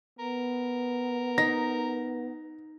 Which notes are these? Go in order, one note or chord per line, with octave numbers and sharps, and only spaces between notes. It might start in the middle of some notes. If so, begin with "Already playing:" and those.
B3 A#4
D#4 A#6